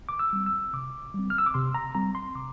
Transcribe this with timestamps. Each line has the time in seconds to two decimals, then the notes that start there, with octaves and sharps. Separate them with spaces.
0.09 D6
0.19 E6
0.33 G3 C4
0.46 E6
0.73 C3 D6
1.14 G3 C4
1.30 F6
1.38 E6
1.46 D6
1.54 C3 C6
1.74 A#5
1.95 G3 C4 A#5
2.15 C6
2.35 C3 D6